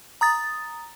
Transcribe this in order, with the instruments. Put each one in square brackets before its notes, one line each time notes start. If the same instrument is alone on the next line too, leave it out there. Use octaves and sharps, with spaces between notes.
[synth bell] A#5 D#6 A6